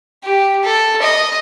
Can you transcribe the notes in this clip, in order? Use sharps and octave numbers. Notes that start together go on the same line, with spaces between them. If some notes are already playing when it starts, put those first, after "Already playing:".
G4
A4
D#5